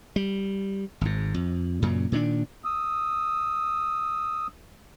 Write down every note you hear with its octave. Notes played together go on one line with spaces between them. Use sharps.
G3
G#1 G#2
F2
F#2 A#2 C#3
A#2 D#3 B3 D4
D#6 E6